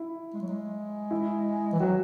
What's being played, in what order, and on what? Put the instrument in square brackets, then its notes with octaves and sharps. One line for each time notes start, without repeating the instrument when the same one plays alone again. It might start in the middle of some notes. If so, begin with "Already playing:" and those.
Already playing: [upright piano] E4
[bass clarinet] G#3
F#3
G#3
[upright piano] E4
[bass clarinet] E3
[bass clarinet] F#3 [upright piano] F#4